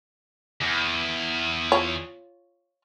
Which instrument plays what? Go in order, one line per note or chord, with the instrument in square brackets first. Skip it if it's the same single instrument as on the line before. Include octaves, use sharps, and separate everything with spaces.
[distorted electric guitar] E2
[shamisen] F4 C#5